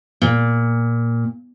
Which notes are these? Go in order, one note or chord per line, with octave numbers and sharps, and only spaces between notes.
A#2